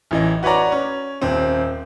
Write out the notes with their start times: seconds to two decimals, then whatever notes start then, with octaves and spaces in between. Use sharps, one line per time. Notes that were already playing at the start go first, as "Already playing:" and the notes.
0.11 A1 E3 D#5
0.43 F#4 B4 C#5 D5 A#5
0.72 C#4
1.22 D#1 C4